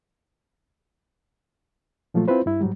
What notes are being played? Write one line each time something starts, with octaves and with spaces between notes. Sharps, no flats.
A#2 F3 F#3 A3 F4
C4 E4 F4 B4 C5
G2 E4
G#2 F#3 G3